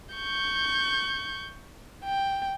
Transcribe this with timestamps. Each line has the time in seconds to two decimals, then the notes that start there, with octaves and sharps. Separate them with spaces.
0.15 C#6 G6
2.04 G5